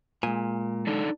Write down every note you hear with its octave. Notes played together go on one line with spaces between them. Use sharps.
A#2 G#3 G#5
D4 D#4 A4